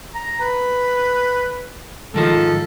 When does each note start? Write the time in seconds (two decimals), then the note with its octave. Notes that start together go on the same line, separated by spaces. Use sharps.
0.15 A#5
0.40 B4
2.14 G#2 D#3 F3 A4